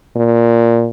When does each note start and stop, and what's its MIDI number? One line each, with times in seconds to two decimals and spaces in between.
0.16 0.89 46